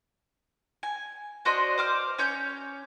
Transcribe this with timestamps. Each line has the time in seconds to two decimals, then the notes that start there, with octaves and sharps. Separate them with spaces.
0.83 G#5
1.45 D4 F#4 C5 D#5
1.78 C5 D6 F6
2.18 C#4 C#5 G6